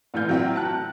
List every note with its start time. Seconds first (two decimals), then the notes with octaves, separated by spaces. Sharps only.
0.14 A#1 A2 E3 F6 G6
0.29 F#3 C4 E4
0.56 A5 F#6